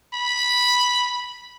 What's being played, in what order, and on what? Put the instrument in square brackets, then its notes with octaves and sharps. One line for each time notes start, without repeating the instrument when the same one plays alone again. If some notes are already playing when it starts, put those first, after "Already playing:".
[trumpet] B5